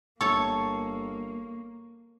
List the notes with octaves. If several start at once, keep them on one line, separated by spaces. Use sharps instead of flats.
G1 A#3 A4 C#5 C#6